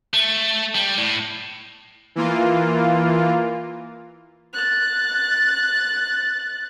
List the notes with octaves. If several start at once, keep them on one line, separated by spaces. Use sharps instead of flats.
A3
G3
A2
E3 A#3 F4
F#6 A6